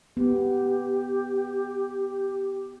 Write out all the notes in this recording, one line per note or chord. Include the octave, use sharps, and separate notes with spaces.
B3 G4